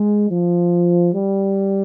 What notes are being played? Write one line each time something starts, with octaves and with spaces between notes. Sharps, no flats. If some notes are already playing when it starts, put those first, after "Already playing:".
Already playing: G#3
F3
G3